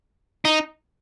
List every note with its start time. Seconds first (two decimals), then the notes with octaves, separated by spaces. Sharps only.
0.45 D#4